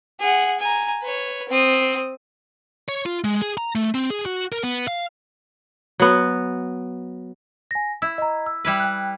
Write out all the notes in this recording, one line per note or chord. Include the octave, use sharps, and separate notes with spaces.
G#4 F#5
G#5 A#5
B4 C#5
C4 D#6
C#5
F4
G#3
G#4
A#5
A3
C4
G#4
F#4
A#4
B3
F5
F#3 B3
G#5 A#6
E4 E6
D#5 A#5
E6
G3 E4 B4
G5 F#6